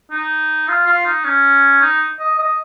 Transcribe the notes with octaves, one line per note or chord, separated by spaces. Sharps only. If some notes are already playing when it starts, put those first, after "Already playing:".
D#4
F4
F4
D#4
C#4
D#4
D#5
D#5